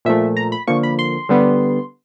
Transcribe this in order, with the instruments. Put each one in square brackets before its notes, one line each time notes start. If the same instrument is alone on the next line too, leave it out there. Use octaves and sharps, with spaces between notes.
[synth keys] A#2 F3 A3 E5
A#5
B5
D3 F3 A#3 C#6
B5
C6
D3 G3 B3